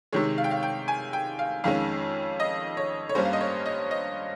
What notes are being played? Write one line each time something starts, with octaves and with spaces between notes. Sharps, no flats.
C3 D#3 G#3 C#5
F5
G5
F5
G5
G#5
G5
F5
F2 D#3 G#3 C#4 F5
D#5
C#5
C#5
G2 G3 A#3 C#4 C5
F5
D#5
C#5
D#5
D#5